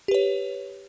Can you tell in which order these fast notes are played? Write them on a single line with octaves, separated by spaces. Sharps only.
G4 B4 C#5